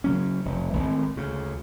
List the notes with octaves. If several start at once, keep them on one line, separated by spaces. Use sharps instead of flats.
C#3 F#3 C#4
F1
G#1 A2
D2 C#3